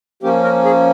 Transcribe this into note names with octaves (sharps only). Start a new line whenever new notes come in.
F3 A#3 C#4 G4
A#4
G#4